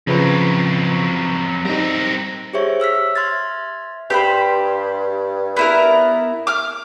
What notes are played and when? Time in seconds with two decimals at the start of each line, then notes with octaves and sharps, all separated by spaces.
0.07 F2 C#3 F3 F#3 B4
1.65 G3 C4 D#4 A#4
2.53 G4 G#4 C5 C#5 E5 C#6
2.80 E5 E6 F6 B6
3.16 E5 C6 F6 G#6 A6
4.10 G2 G4 C5 B5
5.57 B3 E4 A#4
6.47 D6 F6